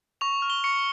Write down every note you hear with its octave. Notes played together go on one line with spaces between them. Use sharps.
C#6 F7
F6
G7
C#6 C#7